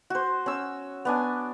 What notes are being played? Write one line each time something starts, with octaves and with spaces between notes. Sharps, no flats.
F#4 C5
C#4 E6
B3 D4 G#5